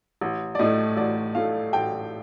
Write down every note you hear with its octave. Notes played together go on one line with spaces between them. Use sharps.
A1
D5
A2 A3 D#5
A1 D5
A2 A3 F5
A1 G5